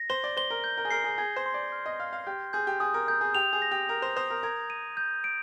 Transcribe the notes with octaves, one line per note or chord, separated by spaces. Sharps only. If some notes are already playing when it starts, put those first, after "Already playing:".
Already playing: A#6
C5 G7
D5
C5 G7
A#4
G6
A#4
G#4
A#4 C7
G#4
G#4 G#6
C5
C6
D5
F6
D#5
F5 F6
F5
G4 G6
G#4 G6
G4
G#4 D#6
A#4
A#4 G6
G#4
G4 F7
G#4
A#6
G4
A#4 A#6
C5
C5 D#6
A#4
A#4 G#6
D#7
G6
D7